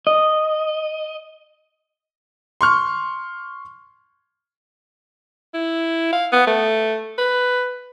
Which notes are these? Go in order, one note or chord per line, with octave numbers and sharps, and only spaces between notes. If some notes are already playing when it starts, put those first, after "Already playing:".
D#5
C6 C#6 F6
E4
F5
B3
A3
B4